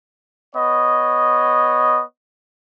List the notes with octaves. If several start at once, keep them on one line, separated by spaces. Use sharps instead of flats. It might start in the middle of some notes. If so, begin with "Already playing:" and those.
B3 C#5 D#5